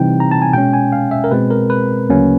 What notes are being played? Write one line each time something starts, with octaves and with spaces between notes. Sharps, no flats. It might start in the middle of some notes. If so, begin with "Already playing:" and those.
Already playing: C3 E3 G3 C4 D#4 G5
A#5
A5
G#5
B2 G#3 C#4 G5
G#5
F5
E5
A#4
B2 G#3 C4 B4
A#4
B4
D2 C#3 F#3 A#3 C#4